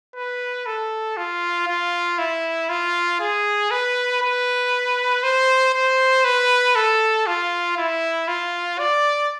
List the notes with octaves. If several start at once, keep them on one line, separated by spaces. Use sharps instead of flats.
B4
A4
F4
F4
E4
F4
G#4
B4
B4
C5
C5
B4
A4
F4
E4
F4
D5